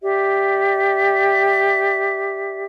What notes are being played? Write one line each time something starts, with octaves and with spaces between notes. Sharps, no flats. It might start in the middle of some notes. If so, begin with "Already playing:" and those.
G4 D5 E5